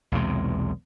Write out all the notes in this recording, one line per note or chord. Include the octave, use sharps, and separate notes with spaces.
B1 E2 C3 G#3